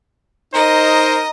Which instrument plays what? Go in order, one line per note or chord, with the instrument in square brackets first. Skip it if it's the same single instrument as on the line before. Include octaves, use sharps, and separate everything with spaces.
[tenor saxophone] D#4 [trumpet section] A#4 C5 [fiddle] D#5 [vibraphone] A#5